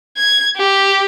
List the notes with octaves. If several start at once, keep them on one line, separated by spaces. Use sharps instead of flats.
G#6
G4